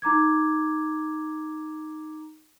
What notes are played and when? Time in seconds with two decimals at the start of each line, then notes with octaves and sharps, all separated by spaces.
0.02 D#4 A#5 D6 G#6